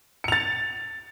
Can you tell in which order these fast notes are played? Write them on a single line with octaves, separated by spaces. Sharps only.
C#7 F7 A6